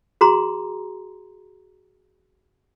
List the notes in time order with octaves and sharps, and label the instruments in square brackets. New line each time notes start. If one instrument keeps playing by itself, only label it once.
[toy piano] F#4 G#4 A#5 C6